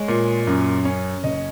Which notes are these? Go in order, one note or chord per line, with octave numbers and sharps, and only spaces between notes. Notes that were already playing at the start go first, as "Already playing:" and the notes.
Already playing: G#3 C#5
A#2
F#2
C#4
F#1 D#5